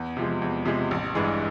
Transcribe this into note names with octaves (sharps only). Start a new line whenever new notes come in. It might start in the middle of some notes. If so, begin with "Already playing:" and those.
Already playing: E2
C3 F3 G#3
E2
C3 F3 G#3
A1
G2 E3 G#3